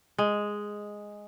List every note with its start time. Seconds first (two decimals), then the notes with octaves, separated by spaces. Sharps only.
0.18 G#3